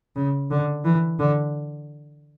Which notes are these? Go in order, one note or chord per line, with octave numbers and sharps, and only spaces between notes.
C#3
D3
E3
D3